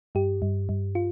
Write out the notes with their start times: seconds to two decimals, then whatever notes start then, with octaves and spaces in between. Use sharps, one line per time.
0.15 G2 G4
0.42 G2
0.69 G2
0.95 F4